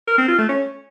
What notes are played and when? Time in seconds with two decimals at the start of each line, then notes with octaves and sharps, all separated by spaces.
0.08 A#4
0.18 C4
0.28 F4
0.39 A3
0.49 C#4